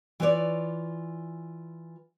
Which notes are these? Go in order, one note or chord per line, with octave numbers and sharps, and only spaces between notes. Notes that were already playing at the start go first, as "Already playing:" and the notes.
E3 F4 B4 C#5 D5